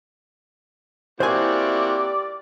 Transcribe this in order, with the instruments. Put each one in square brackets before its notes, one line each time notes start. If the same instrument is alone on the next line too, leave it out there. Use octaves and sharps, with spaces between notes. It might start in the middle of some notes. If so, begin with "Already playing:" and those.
[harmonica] A#3 C4 F#4 [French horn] E4 [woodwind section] G4 D5 [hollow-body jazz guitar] C5 G#5